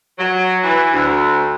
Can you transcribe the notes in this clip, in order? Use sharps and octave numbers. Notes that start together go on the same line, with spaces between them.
F#3
E3
D2